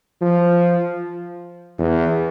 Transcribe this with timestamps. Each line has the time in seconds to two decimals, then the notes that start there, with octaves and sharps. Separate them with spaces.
0.21 F3
1.79 E2